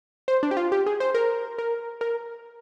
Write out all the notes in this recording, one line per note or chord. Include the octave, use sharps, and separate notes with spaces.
C5
D4
G4
F4
G4
G#4
C5
A#4
A#4
A#4